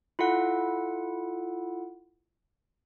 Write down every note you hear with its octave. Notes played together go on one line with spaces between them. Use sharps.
E4 F4 A4 F#5